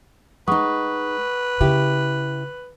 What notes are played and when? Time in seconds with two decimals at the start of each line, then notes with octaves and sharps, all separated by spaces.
0.48 G#3 D#4 B4 F#5 C#6 D#6
1.60 C#3 E4 G4